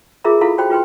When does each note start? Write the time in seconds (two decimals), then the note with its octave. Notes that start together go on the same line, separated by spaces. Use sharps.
0.24 F4 G#4 A#4 E5 A#5 B5
0.41 E4 F4 A4 F5 B5
0.58 F#4 C5 G5 B5
0.70 F4 B4 G5 C6